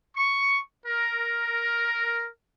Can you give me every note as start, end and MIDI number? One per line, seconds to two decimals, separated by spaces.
0.16 0.60 85
0.86 2.27 70